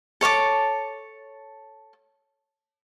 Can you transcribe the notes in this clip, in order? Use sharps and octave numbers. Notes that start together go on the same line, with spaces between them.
A4 C#5 A5 D6